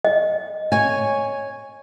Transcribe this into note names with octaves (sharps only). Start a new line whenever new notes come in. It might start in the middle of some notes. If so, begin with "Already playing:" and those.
D#5
C#5 G#5